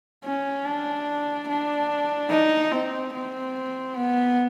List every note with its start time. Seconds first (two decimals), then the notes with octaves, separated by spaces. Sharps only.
0.24 C#4
0.65 D4
1.48 D4
2.30 D#4
2.71 C4
3.13 C4
3.96 B3